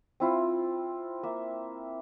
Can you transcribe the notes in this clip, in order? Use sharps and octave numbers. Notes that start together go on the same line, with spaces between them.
C4 E4 F4
A#3 E5